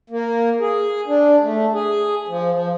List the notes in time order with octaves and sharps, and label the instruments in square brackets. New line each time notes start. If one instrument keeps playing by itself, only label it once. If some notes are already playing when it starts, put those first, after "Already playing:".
[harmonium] A#3
G#4
D4
A3
G#4
F3
F3